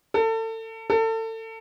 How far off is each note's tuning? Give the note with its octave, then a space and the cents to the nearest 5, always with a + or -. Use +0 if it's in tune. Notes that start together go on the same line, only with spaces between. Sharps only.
A4 +30
A4 +30